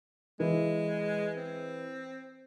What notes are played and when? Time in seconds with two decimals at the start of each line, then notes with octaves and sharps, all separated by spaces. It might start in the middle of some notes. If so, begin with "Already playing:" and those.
0.40 E3 G#3
1.37 C4